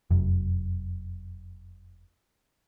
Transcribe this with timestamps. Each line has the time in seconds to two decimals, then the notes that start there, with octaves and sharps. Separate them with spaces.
0.10 F1 F#2